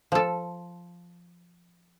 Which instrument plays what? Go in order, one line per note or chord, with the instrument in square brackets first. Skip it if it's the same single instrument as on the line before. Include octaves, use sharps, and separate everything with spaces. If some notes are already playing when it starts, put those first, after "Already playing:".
[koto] F3 A4